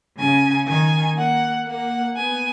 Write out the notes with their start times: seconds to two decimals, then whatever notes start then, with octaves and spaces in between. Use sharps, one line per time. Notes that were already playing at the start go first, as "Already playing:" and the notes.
0.18 C#3 G#5
0.68 D#3 G#5
1.17 A#3 F#5
1.66 A#3 F#5
2.16 B3 G#5